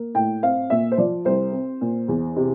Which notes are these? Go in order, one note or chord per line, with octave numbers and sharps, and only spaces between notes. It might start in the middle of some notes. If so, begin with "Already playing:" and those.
Already playing: A#3
A2 G5
C4 F5
A#2 E5
C5
F3 D5
C2 C5
C4
A#2
E2
C3